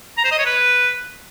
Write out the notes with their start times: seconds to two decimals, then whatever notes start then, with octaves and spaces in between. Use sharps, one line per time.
0.18 A#5
0.25 C5
0.32 D#5
0.39 C#5
0.46 B4